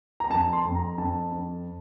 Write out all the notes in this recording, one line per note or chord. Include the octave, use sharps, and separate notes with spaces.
A#5
F2 A5
C6
F2
A#5
F2 A5
F2